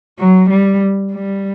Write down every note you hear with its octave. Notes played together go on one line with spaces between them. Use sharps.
F#3
G3
G3